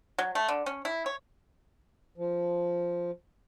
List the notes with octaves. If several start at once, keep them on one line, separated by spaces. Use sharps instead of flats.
F#3
A3
D3
C#4
E4
C#5
F3